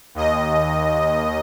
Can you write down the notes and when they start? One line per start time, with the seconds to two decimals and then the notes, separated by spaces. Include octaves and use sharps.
0.15 D#2 D#5